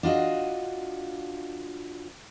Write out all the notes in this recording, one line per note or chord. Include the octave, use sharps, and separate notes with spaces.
D4 F4 F#4 D#5